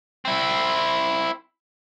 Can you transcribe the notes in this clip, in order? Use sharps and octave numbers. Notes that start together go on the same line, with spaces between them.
C4 E4